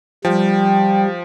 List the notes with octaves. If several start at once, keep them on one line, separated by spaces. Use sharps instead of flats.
F3 G3 G5